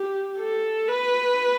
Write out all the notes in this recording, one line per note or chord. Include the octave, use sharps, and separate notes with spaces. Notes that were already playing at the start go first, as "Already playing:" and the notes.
Already playing: G4
A4
B4